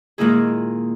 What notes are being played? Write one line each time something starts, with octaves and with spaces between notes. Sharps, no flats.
A#2 D#3 G#3 A#3 E4 G#4